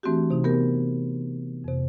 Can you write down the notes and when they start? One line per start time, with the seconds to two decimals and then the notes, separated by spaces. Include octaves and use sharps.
0.03 E3 A3 C4 D4 F#4 G4
0.30 C3 D#4
0.44 B3 G4 A#4
1.64 F2 C3